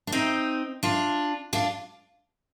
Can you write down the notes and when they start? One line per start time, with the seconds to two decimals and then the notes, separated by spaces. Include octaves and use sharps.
0.07 D4
0.12 C4 D#4
0.83 D4 F4
1.53 D4 F4